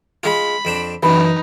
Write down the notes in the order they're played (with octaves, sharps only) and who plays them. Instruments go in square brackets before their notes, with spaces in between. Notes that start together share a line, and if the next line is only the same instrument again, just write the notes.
[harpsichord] G#3 F4 [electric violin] B5
[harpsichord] F2 C4 D4
[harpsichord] F#2 E3 [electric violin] D#4 [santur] B4